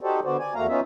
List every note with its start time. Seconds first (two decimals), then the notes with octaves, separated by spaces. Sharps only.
0.01 D#4 F#4 G4 A4 C5 D5
0.24 D3 B3 F#4 C5 D5
0.39 D5 G#5
0.55 E2 A3 A#3 F#4 F5 A#5
0.68 B3 C#4 D#4 F4 E5